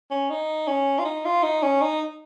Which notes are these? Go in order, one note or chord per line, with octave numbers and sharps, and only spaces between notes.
C#4
D#4
C#4
F4
D#4
F4
D#4
C#4
D#4